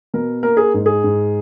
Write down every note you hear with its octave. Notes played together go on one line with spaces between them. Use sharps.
B2 A#4
A#3 A#4
G#4
G#2
G#4
G#2